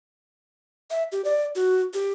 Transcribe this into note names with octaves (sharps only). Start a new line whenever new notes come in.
E5
G4
D5
F#4
G4